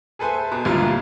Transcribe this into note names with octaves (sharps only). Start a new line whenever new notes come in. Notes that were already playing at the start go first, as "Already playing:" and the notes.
G#4 A4 B4 C5 E5 G#5
B2
G#1 D2 G2 A#3 E4 F4
A#2